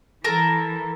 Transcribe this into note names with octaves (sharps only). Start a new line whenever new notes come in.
E3 A4 A#4